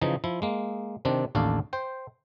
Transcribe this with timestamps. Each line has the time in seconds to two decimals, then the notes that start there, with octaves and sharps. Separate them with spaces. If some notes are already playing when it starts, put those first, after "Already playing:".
0.01 C#3 E3 F3 D#4
0.24 F3 E4
0.42 G#3 A#3
1.05 C3 D#3 C4 D4
1.35 A1 D#2 D4 A4 F5
1.73 C5 G5